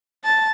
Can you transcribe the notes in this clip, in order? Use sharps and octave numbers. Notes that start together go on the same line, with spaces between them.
A5